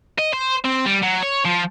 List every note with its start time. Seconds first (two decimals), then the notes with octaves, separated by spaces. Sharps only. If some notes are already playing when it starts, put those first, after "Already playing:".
0.18 D#5
0.33 C5
0.65 C4
0.86 G3
1.03 F#3
1.23 C#5
1.45 F3